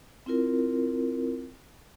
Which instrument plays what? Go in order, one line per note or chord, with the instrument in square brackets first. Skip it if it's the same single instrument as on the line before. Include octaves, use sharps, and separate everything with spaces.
[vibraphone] C4 E4 F4 A#4